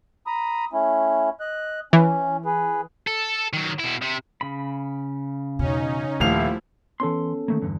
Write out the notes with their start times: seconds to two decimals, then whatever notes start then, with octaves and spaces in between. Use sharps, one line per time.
0.27 A#5 B5 D#6
0.73 A3 C#4 E4
1.40 D#5 F#6
1.93 E3 C#4
2.45 G#4 B4
3.07 A4
3.53 D#3 F#3
3.80 B2 E4
4.02 C3
4.41 C#3 B5
5.59 E2 B2 C#4 D#4
6.20 D#1 F3 A3 E4 F5 F7
7.00 E3 B3 C#4 A4 C6
7.48 D#3 A3 A#3
7.62 E2 G2 D3